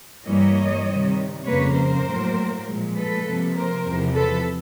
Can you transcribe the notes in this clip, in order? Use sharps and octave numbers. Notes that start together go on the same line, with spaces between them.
G2 E3 G3 A#3 C#5 D#5
C3 D#3 G3
F2 C#3 F3 A#3 B4 C#5
A#4 C5
A2 F#3 A#3
A#2 F3 G#3
A4 B4
C3 F3 A#3
A#4 C5
E2 C3 F3
A4 B4